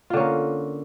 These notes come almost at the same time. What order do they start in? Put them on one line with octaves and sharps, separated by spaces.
F4 D3 C#4 A#3